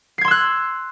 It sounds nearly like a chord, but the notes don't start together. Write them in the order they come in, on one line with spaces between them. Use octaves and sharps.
C7 G#6 C6 E6 F#6